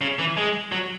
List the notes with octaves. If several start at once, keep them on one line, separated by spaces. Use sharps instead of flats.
C#3
E3
G#3
F#3